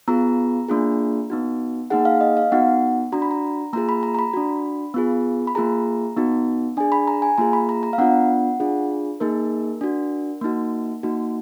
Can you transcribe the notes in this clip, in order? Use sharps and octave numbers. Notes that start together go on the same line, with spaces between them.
B3 F4 G#4 A#5
A#3 D4 F4 G#4
B3 D#4 F#4
A#3 D#4 G#4 F#5
F5
D#5
F5
B3 D#4 F#4 F#5
D4 F#4 A#5
B5
A#5
A#3 F4 G#4 A#5
B5
A#5
A#5
B5
D4 F#4
B3 F4 G#4
B5
A#3 F4 G#4 A#5
B3 D#4 F#4
D4 G#4 G#5
B5
A#5
G#5
A#3 F4 G#4 A#5
B5
A#5
A#5
F5
B3 D4 F4 F#5
D4 F4 G#4
A#3 D#4 G#4 A#4
D4 F#4
A#3 D#4 F#4
A#3 D#4 F#4